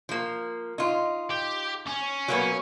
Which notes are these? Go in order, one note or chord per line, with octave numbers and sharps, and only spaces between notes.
F3 A#3
D#4 F4
G4
C#4
F#3 A#3 B3